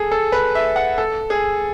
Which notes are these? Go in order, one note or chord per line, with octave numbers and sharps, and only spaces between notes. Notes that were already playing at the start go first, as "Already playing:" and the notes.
Already playing: G#4 A4
A4
B4
E5
F#5
A4
G#4